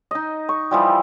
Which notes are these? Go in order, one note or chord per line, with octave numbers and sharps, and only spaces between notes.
D#4 D#5
C#6
E3 F3 G3